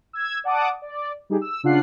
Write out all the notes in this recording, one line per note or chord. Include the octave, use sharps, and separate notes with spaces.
E6 G#6
D5 F#5 A5 D6 D#6
D5
G3 D#4 G4 G#4
E6
C#3 D4 F4 F#5 F#6 C7